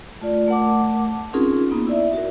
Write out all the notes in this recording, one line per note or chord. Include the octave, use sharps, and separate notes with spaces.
A3 F4 D5
A3 A#4 F#5 A5 D6
C4 C#4 D#4 F4 G#4 A#4
A#3 B3 D#4
E4 D5 E5
F#4 A#4